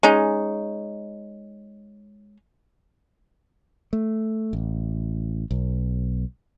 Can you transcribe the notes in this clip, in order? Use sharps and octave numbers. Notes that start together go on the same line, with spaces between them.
G#3 C#4 D#4
A3
A1
B1